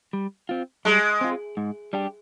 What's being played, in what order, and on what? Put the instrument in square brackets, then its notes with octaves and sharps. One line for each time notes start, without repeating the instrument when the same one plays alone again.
[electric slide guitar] G3
C4 F4
[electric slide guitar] G3 [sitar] G#3
[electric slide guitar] C4 F4
G#2
G3 D4 G4